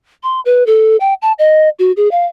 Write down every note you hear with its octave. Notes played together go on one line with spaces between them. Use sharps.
C6
B4
A4
G5
A5
D#5
F#4
G#4
F5